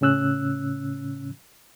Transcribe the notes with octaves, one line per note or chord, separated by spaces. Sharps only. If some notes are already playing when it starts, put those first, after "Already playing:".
A2 C#3 C#4 E6 F#6